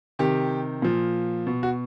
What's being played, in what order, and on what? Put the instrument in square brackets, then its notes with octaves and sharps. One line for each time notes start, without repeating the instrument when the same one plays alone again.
[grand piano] C3 D#3 G4
A#2 F3
B2
F#4